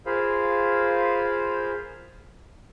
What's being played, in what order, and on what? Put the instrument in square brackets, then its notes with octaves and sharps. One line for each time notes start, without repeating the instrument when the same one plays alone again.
[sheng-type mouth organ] F4 G#4 A#4 C5 F5 B5